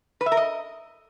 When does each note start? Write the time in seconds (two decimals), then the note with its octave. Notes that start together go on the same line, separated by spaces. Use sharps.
0.21 B4
0.26 E5
0.32 A#4
0.37 D#5